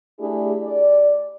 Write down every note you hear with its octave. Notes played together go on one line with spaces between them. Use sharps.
A3 D4 E4 G4 G#4
D5